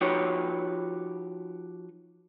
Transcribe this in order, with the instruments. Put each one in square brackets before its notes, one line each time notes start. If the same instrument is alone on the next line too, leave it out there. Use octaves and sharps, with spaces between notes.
[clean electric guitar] F3 D#4 F#4 G4 B4 C#5